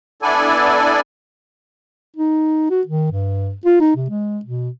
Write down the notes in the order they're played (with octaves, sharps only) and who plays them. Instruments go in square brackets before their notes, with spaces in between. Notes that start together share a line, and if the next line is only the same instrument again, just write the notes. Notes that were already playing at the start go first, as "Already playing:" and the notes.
[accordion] B3 D4 E4 A4 D5 G#5
[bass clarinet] D#4
F#4
D#3
G2
F4
D#4
C3
G#3
B2